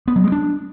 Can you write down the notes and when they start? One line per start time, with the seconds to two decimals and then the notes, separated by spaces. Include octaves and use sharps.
0.08 B3
0.16 F#3
0.24 G#3
0.32 D4